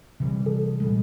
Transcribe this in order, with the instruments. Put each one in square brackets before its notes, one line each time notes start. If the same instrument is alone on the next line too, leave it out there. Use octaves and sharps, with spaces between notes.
[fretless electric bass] C3 E3 G3
[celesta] A4
[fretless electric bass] A#2 G3 G#3